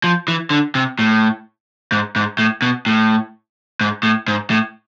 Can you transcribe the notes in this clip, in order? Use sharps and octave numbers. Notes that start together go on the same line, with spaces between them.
F3
E3
D3
C3
A2
G#2
G#2
A2
B2
A2
G#2
A2
G#2
A2